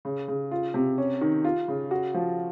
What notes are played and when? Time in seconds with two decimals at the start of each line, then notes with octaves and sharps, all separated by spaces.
0.05 C#3
0.28 C#3
0.51 F4
0.74 C3
0.98 C#4
1.21 D#3
1.44 F4
1.68 C#3
1.91 F#4
2.14 F3